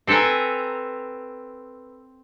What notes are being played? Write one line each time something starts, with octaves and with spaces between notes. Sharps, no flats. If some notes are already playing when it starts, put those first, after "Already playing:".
C4 A4 B4 G#5 A#5